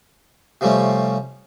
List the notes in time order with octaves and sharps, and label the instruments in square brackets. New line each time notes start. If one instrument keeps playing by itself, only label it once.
[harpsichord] C3 F3 G3 A3 C#4